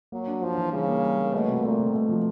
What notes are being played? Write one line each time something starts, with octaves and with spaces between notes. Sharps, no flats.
F#3 A#3
D4
F3 D4
E3
C#3 G3
A#3
G3
A#3
B2 A3
C3
A#2 A3
C3
B2 A3
F3